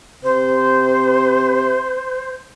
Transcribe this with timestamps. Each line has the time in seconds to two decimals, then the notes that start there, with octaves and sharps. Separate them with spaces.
0.23 C3 C5